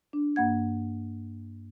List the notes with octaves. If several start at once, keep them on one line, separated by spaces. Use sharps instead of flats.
D4
G2 A#3 F#5 G#6